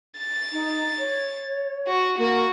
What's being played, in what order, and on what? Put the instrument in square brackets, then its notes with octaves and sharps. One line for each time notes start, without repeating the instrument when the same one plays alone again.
[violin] A6
[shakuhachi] D#4
C#5
[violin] F#4
[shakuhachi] A#3 [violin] F#4